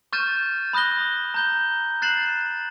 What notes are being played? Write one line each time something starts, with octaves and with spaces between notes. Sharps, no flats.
C#6 F6 G6 A6 D#7 E7
B5 D#6 F#6 A#6 G7
A#5 G6 G7
F#6 A6 C7 E7 F#7